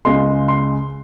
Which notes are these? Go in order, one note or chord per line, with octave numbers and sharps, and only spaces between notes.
C#2 C#3 G#3 C6
C6